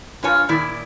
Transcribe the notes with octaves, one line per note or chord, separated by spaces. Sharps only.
G2 F4 C#5 G#5
A#2 D#3 E4 D5